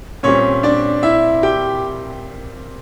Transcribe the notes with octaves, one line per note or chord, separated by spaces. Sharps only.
A#2 G3 C4 C#4 C#5
D4 D5
E4 E5
G4 G5